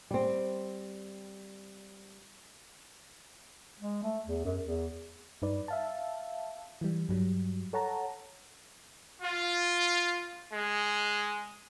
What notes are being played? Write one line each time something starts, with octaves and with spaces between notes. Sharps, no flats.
G3 C4
G#3
A3
E2
F#2
E2
G2 D#4 B4 D5
E5 F5 A5
E3 G3
G2 F#3 G3
A4 C#5 F#5 A5 A#5
F4
G#3